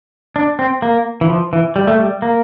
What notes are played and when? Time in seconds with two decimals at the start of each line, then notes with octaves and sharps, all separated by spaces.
0.36 D4
0.59 C4
0.82 A#3
1.21 E3
1.30 F3
1.53 E3
1.76 G3
1.87 A3
1.99 G3
2.22 A#3